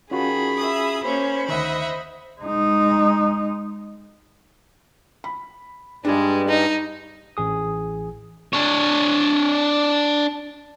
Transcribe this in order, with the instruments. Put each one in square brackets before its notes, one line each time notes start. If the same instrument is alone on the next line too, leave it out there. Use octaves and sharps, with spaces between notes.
[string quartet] D#3 [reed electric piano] C#4 F4 F#4 [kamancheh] G#4 B5
[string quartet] E5 D#6
[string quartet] A#3 C#4 [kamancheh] C5 B5
[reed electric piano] D2 D#3 [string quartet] D#5 E5 F#5
[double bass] G#3 D#4
[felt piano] B5
[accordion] G2 G3 [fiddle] G#3 [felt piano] D4 G#4
[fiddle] D#4
[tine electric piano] A1 G#4 D#6
[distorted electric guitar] D4 C#5